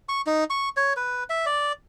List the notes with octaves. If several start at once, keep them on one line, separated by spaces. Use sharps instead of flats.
C#6
D#4
C#6
C#5
B4
E5
D5